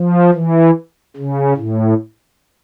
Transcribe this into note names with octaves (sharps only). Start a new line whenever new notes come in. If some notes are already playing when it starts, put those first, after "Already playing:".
Already playing: F3
E3
C#3
A2